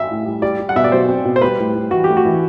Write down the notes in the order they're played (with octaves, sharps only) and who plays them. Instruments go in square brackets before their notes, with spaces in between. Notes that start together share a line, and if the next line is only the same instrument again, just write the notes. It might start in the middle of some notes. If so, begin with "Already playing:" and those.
Already playing: [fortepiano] E5
[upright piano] A2
G3
[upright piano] G3 [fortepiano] D5
[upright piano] G3
[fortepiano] F#5
[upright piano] B2 [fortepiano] E5
[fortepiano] D5
[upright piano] F#3 [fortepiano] C5
[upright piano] C4
B2
[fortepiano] C5
[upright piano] G3 [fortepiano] B4
[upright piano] A2
G3
[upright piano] E3 [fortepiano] F#4
[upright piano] A3 [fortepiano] G4
[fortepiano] F#4
[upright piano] E3